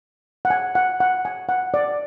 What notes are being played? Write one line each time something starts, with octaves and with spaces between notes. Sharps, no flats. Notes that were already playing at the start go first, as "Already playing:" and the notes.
F#5
G#5
F#5
F#5
G#5
F#5
D5